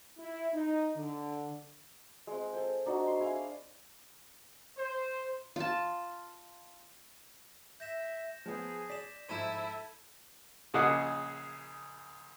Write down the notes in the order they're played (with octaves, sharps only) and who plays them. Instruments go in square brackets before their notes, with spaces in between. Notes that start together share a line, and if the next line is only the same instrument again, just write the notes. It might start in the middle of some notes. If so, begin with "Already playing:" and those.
[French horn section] E4
D#4
D3
[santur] G#3 C4
G#4 A4 G5
D4 D#4 F#4 D#5
C6
E4 G#4 F5 G#5
[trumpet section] C5
[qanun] F4 A5
[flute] E5 [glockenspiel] G6 A#6 E7
[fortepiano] F3 B3 [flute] G#4
[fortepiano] D5 [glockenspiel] B6 E7
[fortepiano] G#2 F3 [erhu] E4 [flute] A4 [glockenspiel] A5 G#6 D#7
[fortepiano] A#1 C#3 G#4 D#5 F#5 D6